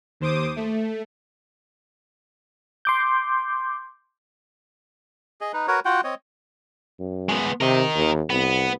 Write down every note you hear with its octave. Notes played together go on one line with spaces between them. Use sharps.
D#2 C5 D6 D#6
A3
C6 D6 G6
G#4 D#5
D#4 B4
F#4 A#4 B4 C#5
F4 F#4 F#5 G5
C4 C#5 D#5
F#2
G#3 B3
C3 A#4 D#5
D#2
C2 B3